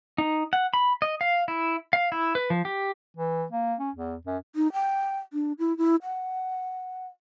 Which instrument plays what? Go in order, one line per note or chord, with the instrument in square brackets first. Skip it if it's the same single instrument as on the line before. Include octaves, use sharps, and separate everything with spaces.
[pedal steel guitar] D#4
F#5
B5
D#5
F5
E4
F5
E4
B4
F3
G4
[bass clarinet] E3
A#3
C#4
E2
F#2
[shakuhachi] D#4
G5
D4
E4
E4
F#5